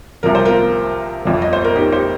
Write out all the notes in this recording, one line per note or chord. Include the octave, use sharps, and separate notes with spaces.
C2 C3 F3 A#4
C5
F4 A#4
G1 F2 F3
D#5
C5
A#4
D#4 G4
G4 C5